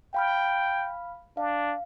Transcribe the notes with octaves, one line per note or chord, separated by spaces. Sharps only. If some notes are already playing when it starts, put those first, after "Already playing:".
F5 G5 B5 F6
D4 F5